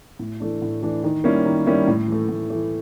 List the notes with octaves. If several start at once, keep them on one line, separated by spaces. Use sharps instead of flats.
A2
E3 A3 D4
A2
E3 A3 D4
D#3
G3 A#3 C#4 E4
D#3
G3 A#3 C#4 E4
A2
E3 A3
A2
E3 A3